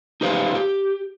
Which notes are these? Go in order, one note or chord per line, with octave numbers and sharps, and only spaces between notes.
D#4 G4 B4 C5 F5
G4